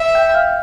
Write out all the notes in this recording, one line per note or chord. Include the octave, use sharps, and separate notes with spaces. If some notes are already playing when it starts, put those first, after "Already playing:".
Already playing: E5
G5 G6
F5 F6